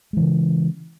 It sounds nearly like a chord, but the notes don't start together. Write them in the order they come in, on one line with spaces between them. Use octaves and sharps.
G#3 E3 C#3